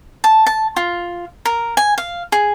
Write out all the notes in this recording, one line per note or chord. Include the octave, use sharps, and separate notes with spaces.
A5
A5
F4
A#4
G#5
F5
G#4